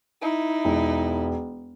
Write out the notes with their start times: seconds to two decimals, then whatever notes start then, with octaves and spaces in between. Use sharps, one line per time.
0.22 D#4 E4
0.65 E1